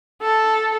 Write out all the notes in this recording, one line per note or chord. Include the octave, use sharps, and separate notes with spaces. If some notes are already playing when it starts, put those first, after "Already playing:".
A4